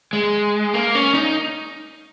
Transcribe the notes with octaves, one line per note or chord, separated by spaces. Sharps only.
G#3
A#3
C#4
D#4